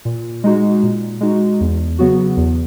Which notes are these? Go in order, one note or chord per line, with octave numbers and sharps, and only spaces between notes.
A#2
G#3 D#4 F#4
A#2
G#3 D#4 F#4
E2
C#3 F#3 B3 F#4
E2